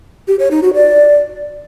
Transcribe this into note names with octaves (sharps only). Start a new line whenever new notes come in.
G4
C#5
D#4
F#4
D5